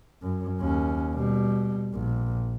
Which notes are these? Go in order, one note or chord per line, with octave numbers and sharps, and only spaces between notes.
F#2
D#2 C#4
B2 G3
A#1